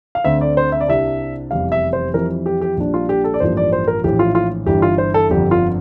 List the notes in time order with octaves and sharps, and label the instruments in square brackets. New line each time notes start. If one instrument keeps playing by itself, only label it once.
[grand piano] F5
D2 D3 A3 C4 E5
D5
C5
E5
D5
C2 C3 G3 D4 E5
F1 E2 C3 E3 G3 F5
E5
C5
F2 E3 G3 C4 A#4
G4
G4
A#1 A#2 G3 D4
F4
G4
A4
D5
A1 G2 F3 A#3 C5
D5
C5
A#4
A#1 A2 E3 G4
F4
F4
G1 G2 E3 G4
F4
C5
A4
G1 F2 D3 G4
F4